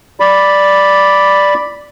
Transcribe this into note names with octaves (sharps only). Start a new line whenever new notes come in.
D5 B5